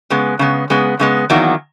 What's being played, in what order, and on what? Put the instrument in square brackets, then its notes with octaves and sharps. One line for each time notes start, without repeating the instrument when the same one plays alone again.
[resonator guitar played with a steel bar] C#3 G#3 B3
C#3 G#3 B3
C#3 G#3 B3
C#3 G#3 B3
E2 D#3 F#3 A#3